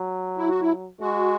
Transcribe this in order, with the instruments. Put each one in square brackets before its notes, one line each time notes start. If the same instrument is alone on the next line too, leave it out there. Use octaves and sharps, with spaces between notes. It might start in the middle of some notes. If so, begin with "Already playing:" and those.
Already playing: [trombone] F#3
[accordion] E4
F#4
E4
[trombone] G#3 [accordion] F#4